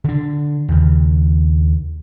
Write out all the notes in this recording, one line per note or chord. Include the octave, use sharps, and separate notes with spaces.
D3 D4
D#2 C#3